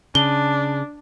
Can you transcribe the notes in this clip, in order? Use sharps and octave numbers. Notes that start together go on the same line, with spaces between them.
C#3 D4 G7